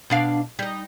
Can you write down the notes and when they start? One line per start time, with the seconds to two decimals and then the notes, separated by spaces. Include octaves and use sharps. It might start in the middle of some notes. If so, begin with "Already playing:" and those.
0.10 B2 D4 F5
0.59 G3 D#4